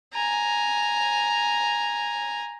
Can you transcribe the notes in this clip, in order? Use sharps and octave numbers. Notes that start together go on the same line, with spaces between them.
G#5 A#5